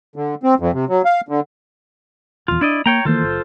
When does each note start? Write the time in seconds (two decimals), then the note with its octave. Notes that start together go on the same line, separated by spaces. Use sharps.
0.16 D3
0.43 C4
0.60 F2
0.74 C3
0.89 F#3
1.05 F5
1.29 D3
2.48 D#1 E2 F4
2.61 D4 E4 D5 D#5
2.86 A#3 C#5 G5 A#5
3.05 D#3 E3 A#3 F4 A4 C5
3.22 F#1